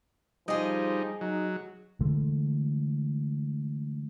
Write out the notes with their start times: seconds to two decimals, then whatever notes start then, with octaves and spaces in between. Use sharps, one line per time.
0.48 F3 G3 D#4 G#4 D#5
1.21 F#3 D#4
2.01 D3 E3 G#3 A3